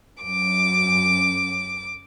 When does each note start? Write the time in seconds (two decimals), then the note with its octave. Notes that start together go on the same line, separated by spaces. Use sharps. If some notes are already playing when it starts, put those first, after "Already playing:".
0.23 F#2 D6